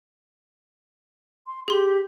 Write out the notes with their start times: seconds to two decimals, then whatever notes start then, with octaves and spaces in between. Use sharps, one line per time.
1.47 C6
1.68 G4 G#4 C6